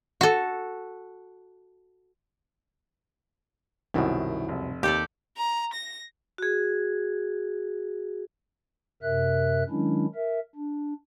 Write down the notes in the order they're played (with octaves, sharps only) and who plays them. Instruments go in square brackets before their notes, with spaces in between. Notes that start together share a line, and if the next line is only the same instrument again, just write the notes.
[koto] F#4 A4
[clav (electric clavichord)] C2 F#2 B2 [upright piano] D#3 E4
[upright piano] F1
[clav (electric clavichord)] D#2 [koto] G4 A4 D5
[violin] A#5
A#6
[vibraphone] F#4 G#4
[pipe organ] F#2 C3 A#4 E5 F#6
D#3 F#3 G#3 C#4 D4 E4
A#4 E5
D4